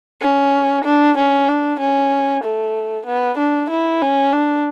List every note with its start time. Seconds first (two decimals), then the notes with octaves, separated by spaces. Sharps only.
0.22 C#4
0.85 D4
1.17 C#4
1.48 D4
1.80 C#4
2.44 A3
3.06 B3
3.38 D4
3.70 E4
4.02 C#4
4.33 D4